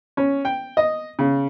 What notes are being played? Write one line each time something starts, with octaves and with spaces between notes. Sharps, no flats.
C#4
G5
D#5
C#3